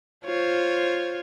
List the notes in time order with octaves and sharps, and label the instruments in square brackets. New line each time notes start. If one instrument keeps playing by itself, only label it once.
[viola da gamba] F4 C5 C#5